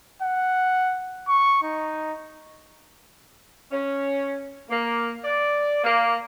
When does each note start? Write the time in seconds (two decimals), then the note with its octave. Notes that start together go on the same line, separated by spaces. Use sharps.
0.23 F#5
1.28 C#6
1.63 D#4
3.72 C#4
4.70 A#3
5.24 D5
5.84 A#3